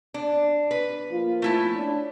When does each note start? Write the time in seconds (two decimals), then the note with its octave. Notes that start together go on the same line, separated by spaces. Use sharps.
0.14 D4
0.71 B4
1.10 F3 A#3 F4
1.42 A3 E4 A5
1.75 C#4 D4